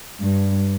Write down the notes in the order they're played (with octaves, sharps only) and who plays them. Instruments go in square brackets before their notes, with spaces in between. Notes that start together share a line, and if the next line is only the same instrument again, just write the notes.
[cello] G2